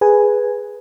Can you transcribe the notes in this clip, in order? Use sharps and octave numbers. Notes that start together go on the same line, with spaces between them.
G#4 B4 G#5